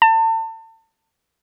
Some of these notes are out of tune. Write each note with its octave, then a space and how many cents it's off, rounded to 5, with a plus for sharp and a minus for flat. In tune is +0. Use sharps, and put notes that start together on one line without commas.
A5 +35